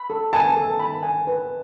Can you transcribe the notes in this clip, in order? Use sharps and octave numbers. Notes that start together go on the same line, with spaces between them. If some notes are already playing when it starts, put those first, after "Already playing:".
Already playing: B5
A4
G#5 A5
A4
B5
G#5
B4